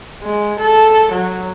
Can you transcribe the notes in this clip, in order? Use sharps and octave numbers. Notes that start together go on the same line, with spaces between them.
G#3
A4
F#3